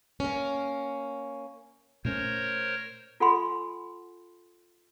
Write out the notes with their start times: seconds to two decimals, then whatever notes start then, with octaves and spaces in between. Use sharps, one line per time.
0.20 A#3 C#4
2.05 A#2 A3 C#4 A#4 C5 C#5
3.20 F4 A4 F#5 G#5 B5 C6